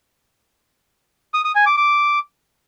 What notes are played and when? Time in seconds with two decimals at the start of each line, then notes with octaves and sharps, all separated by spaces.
1.34 D#6
1.45 D#6
1.55 G#5
1.66 D6
1.77 D6